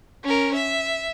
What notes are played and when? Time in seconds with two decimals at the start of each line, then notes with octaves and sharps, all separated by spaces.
0.24 C#4 A#4
0.55 E5